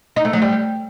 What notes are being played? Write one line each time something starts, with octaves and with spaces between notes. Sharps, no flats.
D#4
A3
F#3
G3